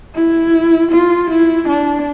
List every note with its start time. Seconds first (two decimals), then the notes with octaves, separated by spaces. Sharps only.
0.15 E4
0.92 F4
1.30 E4
1.68 D4